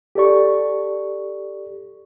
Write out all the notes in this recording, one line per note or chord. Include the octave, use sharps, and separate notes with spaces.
G4 A4 D5 C#6